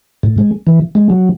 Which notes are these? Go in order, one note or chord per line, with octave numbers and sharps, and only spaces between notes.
A2
G#3
E3
G#3
F#3